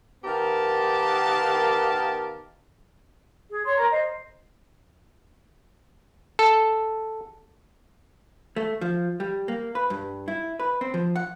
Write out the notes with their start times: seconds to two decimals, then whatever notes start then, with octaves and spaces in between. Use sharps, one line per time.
0.24 D#3 B3 G4 A#4 F5 A5
3.50 G#4
3.65 C#5 C6
3.76 A#4 A#5
3.90 C5 D#5
6.39 A4
8.56 A3
8.81 F3
9.20 G3
9.48 A#3
9.75 B4
9.90 G2
10.28 E4
10.60 B4
10.81 C4
10.94 F3
11.16 F#5